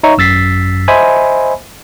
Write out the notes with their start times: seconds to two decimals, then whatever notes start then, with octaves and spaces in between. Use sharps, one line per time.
0.03 D#4 C#5 E5 A#5 C#6
0.17 G#1 F#2 E6 A6 B6 C7
0.88 C5 D#5 E5 G#5 B5